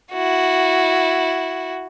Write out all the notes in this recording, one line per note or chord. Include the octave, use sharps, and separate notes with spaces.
E4 F#4